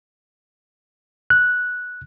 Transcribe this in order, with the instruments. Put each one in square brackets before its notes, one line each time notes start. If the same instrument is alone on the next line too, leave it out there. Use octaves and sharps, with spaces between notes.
[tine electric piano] F#6